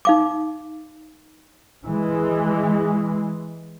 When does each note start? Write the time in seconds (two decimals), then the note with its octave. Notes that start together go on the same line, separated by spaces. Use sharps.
0.05 D#4 F5 D6
1.87 E3 G#3